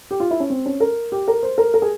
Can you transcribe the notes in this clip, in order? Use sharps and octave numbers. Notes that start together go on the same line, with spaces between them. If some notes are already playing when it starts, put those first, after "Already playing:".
G4
F4
E4
C#4
C4
C#4
A#4
G4
A#4
C5
A#4
A#4
G#4